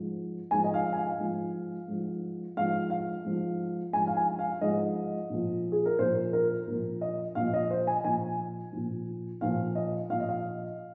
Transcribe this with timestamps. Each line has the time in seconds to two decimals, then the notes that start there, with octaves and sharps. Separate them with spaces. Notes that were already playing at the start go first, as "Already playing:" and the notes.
Already playing: G#2 F3
0.51 G#2 F3 G#5
0.64 D#5
0.74 F5
0.93 G#5
0.97 F5
1.20 G#2 F3
1.88 G#2 F3
2.57 G#2 F3 F5
2.90 F5
3.24 G#2 F3
3.93 G#2 F3 G#5
4.07 F5
4.17 G#5
4.39 F5
4.61 G#2 F3 D#5
5.30 A#2 F3
5.72 G#4
5.86 A#4
5.99 A#2 F3 C5
6.33 A#4
6.67 A#2 F3
7.01 D#5
7.35 A#2 F3 F5
7.54 D#5
7.71 C5
7.87 G#5
8.04 A#2 F3 G#5
8.73 A#2 F3
9.41 A#2 F3 F5
9.75 D#5
10.10 A#2 F3 F5
10.20 D#5
10.29 F5